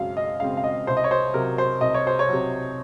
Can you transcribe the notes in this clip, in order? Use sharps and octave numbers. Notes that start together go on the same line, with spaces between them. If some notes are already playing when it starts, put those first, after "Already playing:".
Already playing: F#2 C#3 G#3 C4 F5
D#5
C#3 G#3 C4 F5
F5
D#5
C2 C5
D#5
C#5
C5
C3 F#3 A#4
C5
C2 D#5
C#5
C5
C#5
C3 F#3